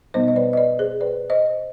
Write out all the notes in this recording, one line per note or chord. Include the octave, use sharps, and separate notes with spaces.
B2 G3 B3 D#4 C5 D#5
D#5
B4 D5
D#5
B4 D5
G#4 C5
B4 D5
C5 D#5